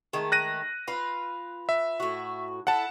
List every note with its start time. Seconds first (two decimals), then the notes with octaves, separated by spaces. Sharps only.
0.13 D#3 G#3 A3
0.32 F#6 A#6 D#7
0.88 F4 B4
1.69 E5
2.00 A2 F#4
2.67 E4 A4 F#5 A5